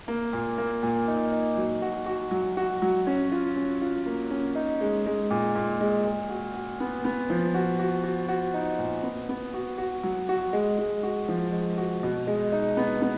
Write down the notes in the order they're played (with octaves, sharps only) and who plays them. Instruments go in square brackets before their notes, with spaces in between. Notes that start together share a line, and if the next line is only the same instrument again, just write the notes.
[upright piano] A#3
A#2
A#3
A#2
D#4
D#4
F#3
F#4
F#4
F#3
F#4
F#3
C#4
F4
C#4
F4
A#3
C#4
D#4
G#3
G#3
A#2
A#2
G#3
A#2
F#4
F#4
B3
B3
F3
F#4
F#4
F#4
F#4
D#4
A#2
B3
B3
F#4
F#4
F#3
F#4
G#3
G#3
F#4
F3
G#3
F#4
B2
G#3
D#4
B3
B3